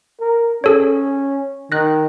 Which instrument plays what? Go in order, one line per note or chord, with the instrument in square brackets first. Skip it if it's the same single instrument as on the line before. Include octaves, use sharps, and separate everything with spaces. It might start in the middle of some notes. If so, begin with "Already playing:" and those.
[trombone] A#4
[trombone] C#4 [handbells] G#4 A4 C#5
[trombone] D#3 [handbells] F#6 A#6